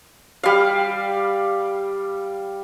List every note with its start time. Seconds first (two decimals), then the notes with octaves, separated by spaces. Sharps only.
0.43 G3 F5